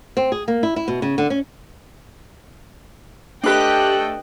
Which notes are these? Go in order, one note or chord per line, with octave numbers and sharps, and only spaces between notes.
C4
G#4
A#3
E4
E4
B2
C#3
D3
C#4
A3 D4 G4 A4 B4 D#5 G5 F#6